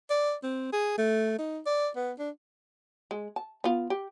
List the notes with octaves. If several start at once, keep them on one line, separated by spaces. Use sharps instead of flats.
D5
C4
G#4
A3
D#4
D5
B3
D4
G#3
A5
B3 F4
G4